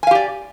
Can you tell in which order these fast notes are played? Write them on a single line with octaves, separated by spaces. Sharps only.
G#5 F5 G4 D5